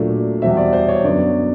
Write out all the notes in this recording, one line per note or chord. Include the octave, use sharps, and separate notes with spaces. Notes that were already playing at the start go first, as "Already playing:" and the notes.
Already playing: A#2 F#3 A3 D4
E2 B2 G3 C4 E5
D5
C5
C#5
F#2 D3 F#3 B3 D5